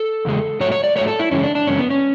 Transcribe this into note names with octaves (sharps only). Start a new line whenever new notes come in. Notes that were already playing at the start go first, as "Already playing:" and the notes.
Already playing: A4
E2 C#3 G#3
G#2 F#3 A3 C#5
C#5
D5
G#2 F#3 A3 C#5
A4
E4
F#2 C#3 E3 G#3 C#4
D4
D4
F#2 C#3 E3 G#3 C#4
B3
C#4